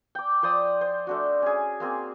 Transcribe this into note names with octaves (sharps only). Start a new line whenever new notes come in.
G5 D6
F3 C5 D5 D#6
C5
A3 D4 F#4
C#4 G#4
A#3 C4 G#4